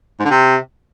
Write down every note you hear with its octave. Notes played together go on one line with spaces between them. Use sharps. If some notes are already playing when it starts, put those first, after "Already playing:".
G#2
D3
C3